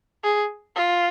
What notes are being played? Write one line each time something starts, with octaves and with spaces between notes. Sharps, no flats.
G#4
F4